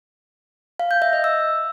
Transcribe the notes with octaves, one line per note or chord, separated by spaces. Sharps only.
F5
G6
E5
D#5
E6